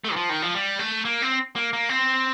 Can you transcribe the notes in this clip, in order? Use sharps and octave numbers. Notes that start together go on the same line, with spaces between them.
A3
D#3
F3
D#3
F3
G3
A3
A#3
C4
A#3
A#3
C4